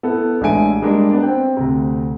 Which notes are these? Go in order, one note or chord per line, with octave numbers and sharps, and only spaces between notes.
B3 E4 A4
A1 G#3 D4 E5 G#5 D7
G3 G#3 A#3 D4
B3 D4 D5
C4 G5
D2 C3